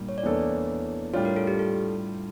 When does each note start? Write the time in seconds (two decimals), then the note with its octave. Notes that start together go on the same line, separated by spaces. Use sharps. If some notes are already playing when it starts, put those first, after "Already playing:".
Already playing: A#2 G3 A#3 D4
0.09 C#5
0.18 D5
0.23 E2 E3 A#3 D4 A4 C#5
1.13 A2 G3 D4 F4 C#5
1.25 A#4
1.36 A4
1.47 G4
1.59 A4